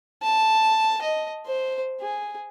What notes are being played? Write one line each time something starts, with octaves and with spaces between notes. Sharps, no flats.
A5
D#5
C5
G#4